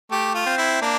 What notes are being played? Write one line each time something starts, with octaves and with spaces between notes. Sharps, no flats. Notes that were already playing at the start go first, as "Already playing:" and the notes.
A3 G4
F4
C4
E4
A#3 D4